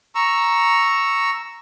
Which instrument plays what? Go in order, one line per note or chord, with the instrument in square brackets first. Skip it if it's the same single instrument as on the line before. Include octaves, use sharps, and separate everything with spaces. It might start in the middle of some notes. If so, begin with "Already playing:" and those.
[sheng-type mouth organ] A#5 C#6 E6